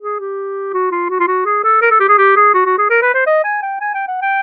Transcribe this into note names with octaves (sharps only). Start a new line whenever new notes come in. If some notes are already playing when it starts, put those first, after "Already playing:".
G#4
G4
F#4
F4
F#4
F4
F#4
G#4
A4
A#4
A4
G4
G#4
G4
G#4
F#4
F#4
G#4
A#4
B4
C5
D#5
G#5
G5
G#5
G5
F#5
G5